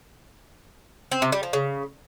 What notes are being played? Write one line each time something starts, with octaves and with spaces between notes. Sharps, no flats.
C4
C3
G3
F3
C#3